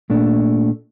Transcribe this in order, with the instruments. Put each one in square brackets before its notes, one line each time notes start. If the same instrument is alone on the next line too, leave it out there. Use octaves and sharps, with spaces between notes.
[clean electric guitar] A#2 A3 D4